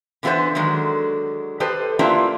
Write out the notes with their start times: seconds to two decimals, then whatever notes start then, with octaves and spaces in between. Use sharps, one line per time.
0.23 D3 E3 B3 F4 B4 C5
0.55 D3 D#3 F#3 G#3
1.60 G4 A4 B4 C5 D#5
1.99 A#3 D4 E4 F4 G4 B4